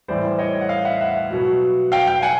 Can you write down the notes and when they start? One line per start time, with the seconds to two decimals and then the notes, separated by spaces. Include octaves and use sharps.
0.08 A2 E3 G3 C5 D5
0.39 C#5 D#5
0.61 F#5
0.69 D#5 F5
0.85 E5 F#5
1.01 E5 F#5
1.31 B2 F#3
1.92 F5 G5
2.07 F5 G5
2.22 F#5 G#5